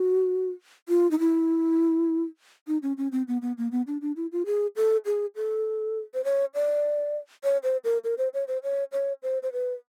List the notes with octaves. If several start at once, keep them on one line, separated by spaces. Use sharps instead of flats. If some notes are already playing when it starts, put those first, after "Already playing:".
Already playing: F#4
F4
D#4
E4
D#4
C#4
C#4
C4
B3
B3
A#3
B3
D4
D4
E4
F4
G#4
A4
G#4
A4
C5
C#5
D5
C#5
C5
A#4
A#4
C5
C#5
C5
C#5
C#5
C5
C5
B4